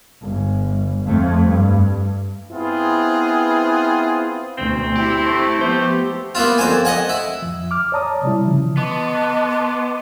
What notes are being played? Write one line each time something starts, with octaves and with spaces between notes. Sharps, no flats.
G1
F2 A3
G2
B3 C4 E4 F4 G#4
D2 B2 C4
E4 G4
A3 C4
F3 B3 C5
A#3 B3 E4 F4
F2 C5 G#5
D#5 F#5 G#5
E4
F2 F3
D6 F6
C#5 D5 A5 A#5 D#6
C3 G3 E4
C#3 E3 F3
B3 D#5 A5 C6 D6